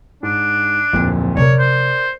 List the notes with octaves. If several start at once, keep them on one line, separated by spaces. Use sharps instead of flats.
G#2 D4
D1 F2 A#2 F#3 E4
C3 F3 A#4 C#5 D5
C5